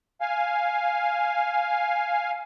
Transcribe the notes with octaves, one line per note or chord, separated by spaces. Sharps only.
F5 G#5